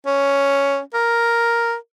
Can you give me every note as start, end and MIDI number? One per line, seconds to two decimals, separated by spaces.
0.06 0.79 61
0.94 1.75 70